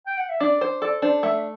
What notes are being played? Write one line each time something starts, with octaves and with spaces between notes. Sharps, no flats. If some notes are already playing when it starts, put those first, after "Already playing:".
G5
F#5
E5
D4 D5
C5
A4 D5
D4 C5
A3 E5